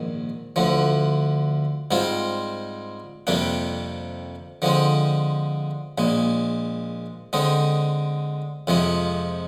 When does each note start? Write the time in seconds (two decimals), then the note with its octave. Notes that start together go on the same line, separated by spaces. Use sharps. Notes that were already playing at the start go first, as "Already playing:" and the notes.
Already playing: A#1 G#2 D#3
0.56 D2 D3 F3
1.91 G#2 G3 C4 F4
3.27 F2 C3 G3 A#3 D4
4.62 D3 F3 G#3 C4
5.98 A#1 A#2 G#3
7.33 D3 G#3 C4 D#4
8.67 F2 C3 F3 G#3